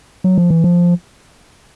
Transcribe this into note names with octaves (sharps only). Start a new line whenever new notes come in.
F#3
F3
E3
F3